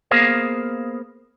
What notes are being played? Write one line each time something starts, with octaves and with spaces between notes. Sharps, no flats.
A#3 B3 G#4 A#4 C5 F5